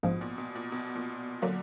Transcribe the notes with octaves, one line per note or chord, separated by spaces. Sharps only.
A#1 G#2 B2 F3
A#2
B2
A#2
B2
A#2
A#2 D3 F#3 A#3